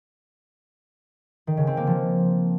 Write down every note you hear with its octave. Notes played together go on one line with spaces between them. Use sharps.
D#3
C#3
C4
A#3
F3